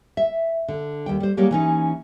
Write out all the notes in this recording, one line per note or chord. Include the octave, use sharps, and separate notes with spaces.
E5
D3
D#2 G3 G5
G3 C5
F#3 G3 A#3 G4 G#4 C#5
E3 C#4 D#4